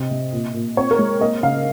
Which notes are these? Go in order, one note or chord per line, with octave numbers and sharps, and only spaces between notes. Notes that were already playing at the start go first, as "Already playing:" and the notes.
Already playing: C3 C4 D#5
C3
A#2
A#2
C4 C#5
A#4
G#3
A#3 D#5
C#3 F5